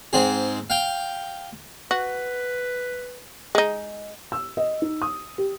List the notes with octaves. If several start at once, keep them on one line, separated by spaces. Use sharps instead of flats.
G#2 C4 G#4
F5 G5
F#4 B4
G#3 D#4
E6
D#5
D#4
D#6
G4